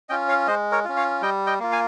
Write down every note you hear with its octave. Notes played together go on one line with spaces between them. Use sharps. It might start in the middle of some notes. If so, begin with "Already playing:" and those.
C#4 F4 D#5 G5
C#5 F5
G#3 C5 D#5
A#4 C#5
C#4 F4
C#5 F5
G3 D#5 G5
D#5 G5
A#3 F4
F5 G#5